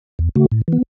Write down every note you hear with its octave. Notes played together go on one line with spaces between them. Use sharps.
E2
C#3 A3 F#4
A2
E3 B3